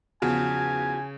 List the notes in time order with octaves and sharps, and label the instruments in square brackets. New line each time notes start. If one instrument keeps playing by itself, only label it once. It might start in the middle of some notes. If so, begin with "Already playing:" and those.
[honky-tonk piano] E2 F3 [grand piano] C#3 [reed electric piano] F#4 [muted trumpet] G#5